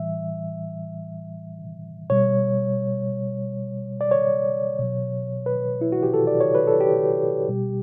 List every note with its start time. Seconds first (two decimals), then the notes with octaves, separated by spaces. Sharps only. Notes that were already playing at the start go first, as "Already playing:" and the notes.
Already playing: A2 E3 G3 E5
2.10 B2 G3 C#5
4.01 D5
4.11 C#5
4.79 B2 F#3
5.46 B4
5.81 E4
5.92 F#4
6.03 G4
6.14 A4
6.27 D5
6.41 C#5
6.55 B4
6.67 A4
6.81 G4
7.48 B2 G3